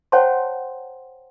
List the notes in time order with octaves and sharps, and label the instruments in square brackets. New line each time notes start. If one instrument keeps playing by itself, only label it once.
[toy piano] C5 C#5 F#5 G5 A5 C6